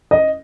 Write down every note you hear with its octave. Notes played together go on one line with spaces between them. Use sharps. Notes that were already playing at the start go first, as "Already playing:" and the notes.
D#5